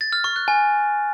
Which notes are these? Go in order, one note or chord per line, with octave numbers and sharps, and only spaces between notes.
A6
F6
C#6
F#6
G#5